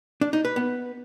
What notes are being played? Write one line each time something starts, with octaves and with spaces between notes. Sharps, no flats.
D4
D#4
B4
B3